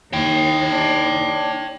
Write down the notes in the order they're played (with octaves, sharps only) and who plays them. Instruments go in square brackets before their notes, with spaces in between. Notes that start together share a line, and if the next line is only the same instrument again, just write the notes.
[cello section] D#2 [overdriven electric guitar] C#5 G5
[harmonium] D4